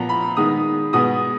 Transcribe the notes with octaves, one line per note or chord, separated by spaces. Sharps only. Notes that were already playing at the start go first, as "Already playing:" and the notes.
Already playing: A#2 F3 B3 A#5
B5
D#3 G#3 B3 D#6
B2 G#3 B3 D#6